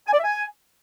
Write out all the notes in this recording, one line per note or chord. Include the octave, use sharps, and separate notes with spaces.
G#5
D5
E5
G#5